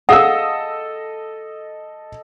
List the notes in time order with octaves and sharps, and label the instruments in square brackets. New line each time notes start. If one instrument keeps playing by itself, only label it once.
[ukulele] G#4 F5 [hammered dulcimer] A4 D#5 [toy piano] F#5 [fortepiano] D#6 E6